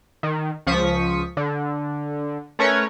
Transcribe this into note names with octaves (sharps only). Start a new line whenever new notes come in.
D#3
C#2 F3 C#6 D#6 B6
D3
A3 C#4 A#4 B4 C#5